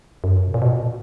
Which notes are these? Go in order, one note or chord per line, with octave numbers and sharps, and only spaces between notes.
F#2
B2
A#2
B2
A#2